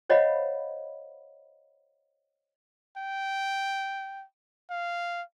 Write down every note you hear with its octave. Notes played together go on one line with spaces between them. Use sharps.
C5 C#5 D#5 F5 F#5 B5
G5
F5